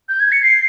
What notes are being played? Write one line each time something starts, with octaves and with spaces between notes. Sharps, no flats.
G6
G#6
C#7
C7